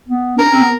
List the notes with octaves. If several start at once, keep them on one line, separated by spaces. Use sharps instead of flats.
B3
D4 A#4
C#4
C4
B3